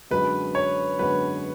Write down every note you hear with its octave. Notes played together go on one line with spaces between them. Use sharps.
F#2 D3 G#3 B3 F#4 B4
C#5
F#2 D3 G#3 B3 F#4 B4